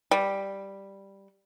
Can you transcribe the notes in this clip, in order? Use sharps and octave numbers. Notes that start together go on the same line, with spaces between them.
G3